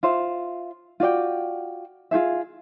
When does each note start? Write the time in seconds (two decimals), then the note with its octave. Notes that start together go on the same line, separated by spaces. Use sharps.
0.03 F4 C5 E5
1.00 F4 F#4 D5 G5
2.11 F4 F#4 G#4 E5